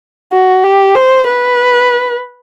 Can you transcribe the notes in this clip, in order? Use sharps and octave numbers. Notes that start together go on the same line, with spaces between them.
F#4
G4
C5
B4